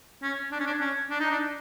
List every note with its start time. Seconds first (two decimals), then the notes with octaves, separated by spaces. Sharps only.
0.23 C#4
0.52 D4
0.60 C#4
0.67 D4
0.81 C#4
1.10 D4
1.20 D#4
1.31 D4